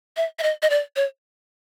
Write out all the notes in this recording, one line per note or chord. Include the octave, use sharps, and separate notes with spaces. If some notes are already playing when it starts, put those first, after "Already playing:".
E5
E5
D#5
D#5
D5
C#5